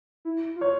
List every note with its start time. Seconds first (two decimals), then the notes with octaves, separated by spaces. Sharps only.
0.25 E4
0.56 F4
0.61 C#5